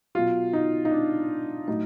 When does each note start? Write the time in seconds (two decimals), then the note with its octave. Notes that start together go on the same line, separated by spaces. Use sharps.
0.15 B2 F#3 F4
0.53 D#4
0.85 D#4
0.91 D4
1.68 A2 F#3 D#4